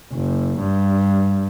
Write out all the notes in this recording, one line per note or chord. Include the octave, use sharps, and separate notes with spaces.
F#1
G2